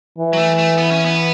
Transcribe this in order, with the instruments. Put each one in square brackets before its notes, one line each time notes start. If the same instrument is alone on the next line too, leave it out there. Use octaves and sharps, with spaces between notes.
[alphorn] E3
[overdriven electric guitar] F#3
A3
A3
B3
C#4
B3